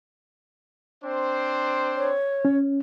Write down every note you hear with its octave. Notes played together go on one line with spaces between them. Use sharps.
C4 D4 C5
C#5
C#4